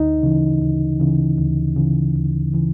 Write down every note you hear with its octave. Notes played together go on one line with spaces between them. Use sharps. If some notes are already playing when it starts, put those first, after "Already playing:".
Already playing: D2 D#4
C#3 E3
D2
C#3 E3
D2
C#3 E3
D2
C#3 E3